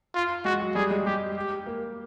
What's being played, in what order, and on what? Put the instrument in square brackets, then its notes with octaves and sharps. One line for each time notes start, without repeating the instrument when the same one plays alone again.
[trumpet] F4
[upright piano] G#3 [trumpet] F#4
[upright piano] F#3
[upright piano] G3 [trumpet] G#4
[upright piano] G#3
[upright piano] G#3 [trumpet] G4
[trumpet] G4
[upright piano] A#3